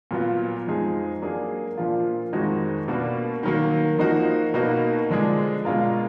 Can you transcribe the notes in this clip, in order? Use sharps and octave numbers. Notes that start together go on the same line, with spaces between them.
A#2 F#3 B3 F4
F2 F3 G#3 D#4 G#4
F#3 A#3 D4 G#4
A#2 F3 A#3 D4 F4
F2 D#3 G#3 D#4 F#4
B2 A#3 D4 F#4 B4
D#3 F#3 A#3
F3 A#3 D#4 F#4
B2 A#3 D#4 F#4 B4
D3 F3 G#3 D4 G#4
B2 G#3 D4 F4 A#4